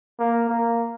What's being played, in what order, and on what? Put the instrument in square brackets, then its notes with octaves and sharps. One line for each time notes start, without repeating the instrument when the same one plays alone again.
[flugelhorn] A#3
A#3